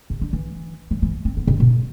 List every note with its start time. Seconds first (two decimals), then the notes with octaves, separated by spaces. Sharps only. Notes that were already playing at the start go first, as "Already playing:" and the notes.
0.10 C3
0.21 D3
0.33 E3
0.91 E3
1.02 E3
1.25 C4
1.37 B3
1.47 C3
1.60 B2